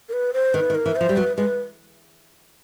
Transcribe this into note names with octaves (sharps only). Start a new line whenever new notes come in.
A#4
B4
C5
D#3 B4
D#3
A#4
E3
F3 C5
G3
F#3 B4
G#3 B4